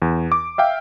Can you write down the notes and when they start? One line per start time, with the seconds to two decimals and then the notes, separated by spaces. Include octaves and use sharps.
0.02 E2
0.32 D6
0.58 E5 F5 G5